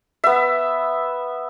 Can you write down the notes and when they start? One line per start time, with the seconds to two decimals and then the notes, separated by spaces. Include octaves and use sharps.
0.24 B3 E5